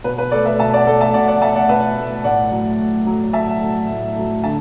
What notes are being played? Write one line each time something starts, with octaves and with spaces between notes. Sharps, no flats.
B2 B4
B4
A3 A4 D5
B4 E5
B2 E5 A5
D5 F#5
A3 A4 D5
E5 A5
B2 D5 F#5
D5 F#5
A3 E5 A5
D5 F#5
B2 B4 E5
A3
A2 D5 F#5
F#3 A3
A2
F#3 A3
A2 E5 A5
F#3 A3
A2
F#3 A3
D3 E5 A5